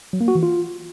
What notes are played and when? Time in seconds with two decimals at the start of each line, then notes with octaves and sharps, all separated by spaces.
0.13 F#3
0.21 A#3
0.28 F#4
0.35 E3
0.43 F4